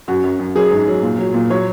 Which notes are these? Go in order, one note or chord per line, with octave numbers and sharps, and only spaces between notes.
F#2 F#4
F#2
F#2
F#3 G#4
G#2
F#3
A#2
F#3
A#2
F#3 C#5